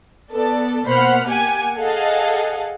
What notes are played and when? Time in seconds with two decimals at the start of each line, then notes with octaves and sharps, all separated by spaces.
0.32 B3 A4 D5
0.85 B2 A#3 C5 F#5 B5 F6
1.25 A#3 G4 F#5 G#5
1.78 G#4 A4 D#5 F5 F#5